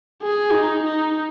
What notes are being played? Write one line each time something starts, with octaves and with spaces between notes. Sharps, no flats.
G#4
D#4
D#4